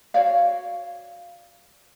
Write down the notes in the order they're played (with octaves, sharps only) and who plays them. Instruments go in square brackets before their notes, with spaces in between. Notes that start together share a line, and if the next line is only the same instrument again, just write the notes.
[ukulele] F#4 C#5 D5 F5